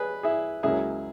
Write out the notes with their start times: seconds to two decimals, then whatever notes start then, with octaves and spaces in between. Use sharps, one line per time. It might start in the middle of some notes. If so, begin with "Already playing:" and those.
Already playing: B3 G#4 B4
0.23 E4 G#4
0.63 C#2 C#3 F#3 A#3 E4 G#4